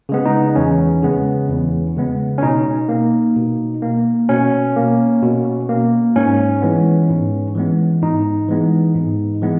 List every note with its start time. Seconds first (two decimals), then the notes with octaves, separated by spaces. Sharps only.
0.09 C#3 G#3 B3
0.26 D#4
0.56 E2 C#4
1.03 C#3 G#3 B3
1.49 E2
1.97 C#3 G#3 B3
2.38 C#4
2.43 B2 D#4
2.89 A#3
3.36 B2
3.82 A#3
4.29 B2 C#4
4.76 A#3
5.23 B2
5.69 A#3
6.16 G#2 C#4
6.62 E3 G#3 B3
7.10 G#2
7.55 E3 G#3 B3
8.02 G#2 D#4
8.48 E3 G#3 B3
8.95 G#2
9.42 E3 G#3 B3